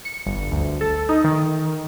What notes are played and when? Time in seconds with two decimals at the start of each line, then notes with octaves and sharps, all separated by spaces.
0.05 C#7
0.26 G1
0.51 D2
0.81 A4
1.09 D#4
1.24 D#3